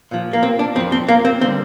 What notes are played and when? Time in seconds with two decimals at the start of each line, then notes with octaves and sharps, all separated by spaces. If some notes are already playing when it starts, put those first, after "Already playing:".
0.11 A#2 F3
0.33 A#3
0.43 C4
0.59 D4
0.75 F2 C4
0.80 F3
0.92 C4
1.09 A#3
1.25 C4
1.41 D3 G3 C4